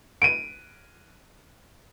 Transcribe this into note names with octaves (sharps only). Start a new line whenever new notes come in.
D7 D#7